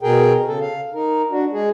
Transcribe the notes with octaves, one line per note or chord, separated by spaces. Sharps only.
B2 G#4 A#4 G5
C#3 A4
F5
D#4 A#4
D4 F#4
G#3 G#4